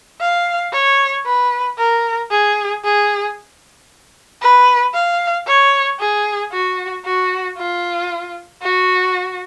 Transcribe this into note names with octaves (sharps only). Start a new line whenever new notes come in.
F5
C#5
B4
A#4
G#4
G#4
B4
F5
C#5
G#4
F#4
F#4
F4
F#4